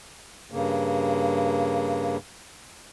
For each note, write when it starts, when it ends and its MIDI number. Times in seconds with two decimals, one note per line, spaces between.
0.52 2.17 43
0.52 2.17 49
0.52 2.17 58